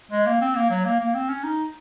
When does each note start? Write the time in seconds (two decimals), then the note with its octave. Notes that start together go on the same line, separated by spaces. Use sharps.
0.12 G#3
0.26 A#3
0.41 C4
0.55 A#3
0.70 F#3
0.85 A#3
1.00 A#3
1.14 C4
1.29 C#4
1.44 D#4